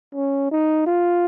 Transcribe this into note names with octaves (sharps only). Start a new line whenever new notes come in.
C#4
D#4
F4